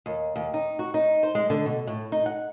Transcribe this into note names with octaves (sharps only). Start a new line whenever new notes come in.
D#2
D#2
D#4
F#4
D#4
C5
G#3
D3
B2
A2
D#4
F#5